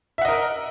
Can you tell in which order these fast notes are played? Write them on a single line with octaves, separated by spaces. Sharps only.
E5 F#5 D#5 A#4